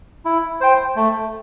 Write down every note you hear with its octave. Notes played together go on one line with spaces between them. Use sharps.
E4
C5 G5
A3